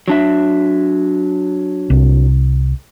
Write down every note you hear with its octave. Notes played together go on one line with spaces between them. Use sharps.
F#3 D4 E5
C2